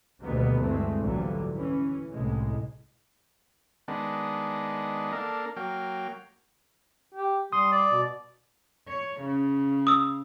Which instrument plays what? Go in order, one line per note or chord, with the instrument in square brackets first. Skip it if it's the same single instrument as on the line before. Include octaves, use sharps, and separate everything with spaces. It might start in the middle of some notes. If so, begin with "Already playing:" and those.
[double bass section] D2 B2 D#3 G3 A#3 B3
G2 E3 G#3 A3 C4
A#1 G#2 D3 E3 F#3 G3
E3 C#4
C2 A2 G#3
[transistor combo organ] D#3 G#3 B3 D4
A#3 D4 A4 A#4
F#3 A#3 G5 F6
[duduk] G4
[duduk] G3 [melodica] C6 [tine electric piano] D#6
[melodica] D5
[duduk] B2
[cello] C#5
C#3
[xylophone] D#6 E6